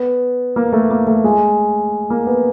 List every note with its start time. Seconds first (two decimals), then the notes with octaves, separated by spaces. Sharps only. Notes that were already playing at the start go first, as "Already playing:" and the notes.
Already playing: B3
0.56 A#3
0.73 A3
0.91 A#3
1.07 A3
1.24 G#3
2.10 A#3
2.27 B3